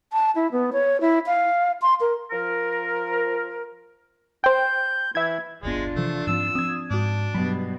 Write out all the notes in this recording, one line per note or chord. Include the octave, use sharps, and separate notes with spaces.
A5
E4
B3
C#5
E4
F5
C6
A#4
F3 A#4
C5 G5 G6
E3 E4 E5 G#6
D1 G1 G#3 B3 D4 F4
C3 E3 F3 A3
G#2 F3 C4 E6
F3 C4 D#6 G#6
G#2 D4 F#4
G2 B2 F#3 B5